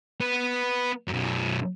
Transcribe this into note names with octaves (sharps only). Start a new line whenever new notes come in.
B3
F#2 B2